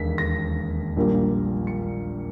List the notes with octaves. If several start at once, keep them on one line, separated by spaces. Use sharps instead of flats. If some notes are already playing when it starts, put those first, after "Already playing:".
Already playing: E1 D#2 D#3 B6
A#6
A#1 A#2 G3 A#3
C#7